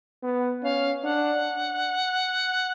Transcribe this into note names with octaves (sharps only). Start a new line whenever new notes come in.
B3
C#4 F5
D4 F#5